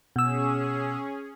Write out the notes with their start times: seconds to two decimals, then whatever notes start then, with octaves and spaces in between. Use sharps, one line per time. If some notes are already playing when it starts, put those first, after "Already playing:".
0.16 B2 C#4 G#4 E6